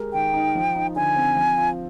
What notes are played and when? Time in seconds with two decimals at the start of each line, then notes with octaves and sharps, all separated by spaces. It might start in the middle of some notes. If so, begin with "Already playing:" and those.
Already playing: G#3 G4 A#4
0.13 D#3 G5
0.33 D#4
0.55 F3
0.75 D#4
0.96 D3 G#5
1.16 C4
1.36 F3
1.58 F4